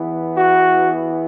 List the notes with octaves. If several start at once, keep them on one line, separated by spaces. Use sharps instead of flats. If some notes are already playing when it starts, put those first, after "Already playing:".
Already playing: E2 E3 B3
F#4